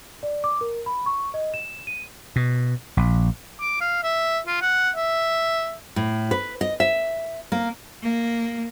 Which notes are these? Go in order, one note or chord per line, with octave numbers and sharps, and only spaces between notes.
D5
D6
A#4
B5
C#6
D#5
E7
D#7
B2
A#1
D6
F5
E5
F4
F#5
E5
A2
B4
D#5
E5
A#3
A#3